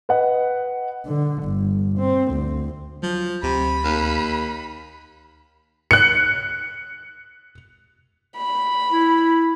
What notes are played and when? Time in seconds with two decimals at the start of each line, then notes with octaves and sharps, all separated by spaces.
0.09 B4 D#5 F#5
1.06 D3
1.44 G1
1.99 C4
2.32 D2
3.03 F3 F#3
3.43 D2 C3 B5
3.84 D#2
5.91 F#6 C#7
8.37 B5
8.92 E4